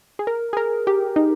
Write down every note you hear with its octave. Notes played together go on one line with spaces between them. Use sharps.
G#4
A#4
G#4
A#4
G4
D#4